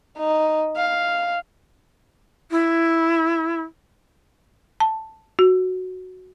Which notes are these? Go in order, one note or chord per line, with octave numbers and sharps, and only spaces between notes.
D#4
F5
E4
A5
F#4